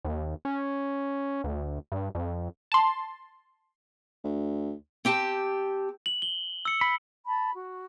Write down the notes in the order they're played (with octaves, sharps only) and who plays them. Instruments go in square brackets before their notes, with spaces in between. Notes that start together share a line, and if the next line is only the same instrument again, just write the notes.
[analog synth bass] D#2
C#4
D2
G2
F2
[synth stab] A5 C6
[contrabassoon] D2
[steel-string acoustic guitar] C4 G4 G5 A5
[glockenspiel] F#7
G7
E6 C#7
[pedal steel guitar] B5
[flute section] A5 B5
F#4